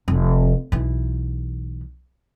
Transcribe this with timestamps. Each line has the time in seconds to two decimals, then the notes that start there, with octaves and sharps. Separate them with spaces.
0.08 F1
0.72 B1 E3